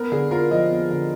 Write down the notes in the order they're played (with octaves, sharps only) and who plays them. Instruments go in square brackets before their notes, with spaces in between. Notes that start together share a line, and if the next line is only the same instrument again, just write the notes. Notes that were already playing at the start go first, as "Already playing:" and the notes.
Already playing: [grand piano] B3 [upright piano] A#4
[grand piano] D3 [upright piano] G#4
[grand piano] F4 [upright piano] A#4
[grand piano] F3 [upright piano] D#5
[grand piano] B3
D3